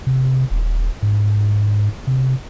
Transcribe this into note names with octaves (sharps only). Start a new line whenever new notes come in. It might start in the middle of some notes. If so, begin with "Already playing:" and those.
C3
D#1
G#2
C3